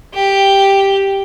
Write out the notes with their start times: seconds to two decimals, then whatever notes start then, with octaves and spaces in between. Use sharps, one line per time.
0.14 G4